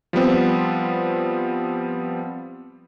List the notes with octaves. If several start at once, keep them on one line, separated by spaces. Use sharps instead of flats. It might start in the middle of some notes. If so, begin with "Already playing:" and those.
F3 G3 B3 C4